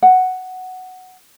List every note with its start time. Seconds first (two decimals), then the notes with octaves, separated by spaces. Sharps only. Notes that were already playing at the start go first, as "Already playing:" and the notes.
0.03 F#5